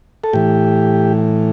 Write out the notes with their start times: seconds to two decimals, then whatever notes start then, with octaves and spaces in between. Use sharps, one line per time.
0.24 A4
0.33 A2 E3 G4